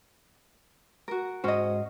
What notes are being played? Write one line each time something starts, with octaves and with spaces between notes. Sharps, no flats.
F#4 A#4
G#2 C#4 F#4 C5 D#5